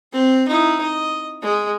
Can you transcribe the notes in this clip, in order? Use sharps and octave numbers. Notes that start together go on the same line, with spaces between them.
C4
D#4 E4
D#5
G#3